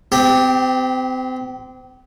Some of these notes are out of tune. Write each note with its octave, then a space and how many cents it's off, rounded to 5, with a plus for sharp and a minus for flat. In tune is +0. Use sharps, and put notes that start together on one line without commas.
C4 -35 G4 +0